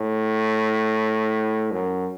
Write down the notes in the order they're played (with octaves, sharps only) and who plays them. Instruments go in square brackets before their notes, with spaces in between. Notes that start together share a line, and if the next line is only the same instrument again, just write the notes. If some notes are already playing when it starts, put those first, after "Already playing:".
Already playing: [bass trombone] A2
F#2